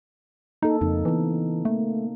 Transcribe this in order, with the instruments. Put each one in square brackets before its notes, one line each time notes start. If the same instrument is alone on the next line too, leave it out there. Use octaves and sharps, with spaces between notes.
[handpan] A#3 A4 [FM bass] D#4
[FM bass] F2 [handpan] C#3 D#4
[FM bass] E3 [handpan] B3 C4
[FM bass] A3 [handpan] A#3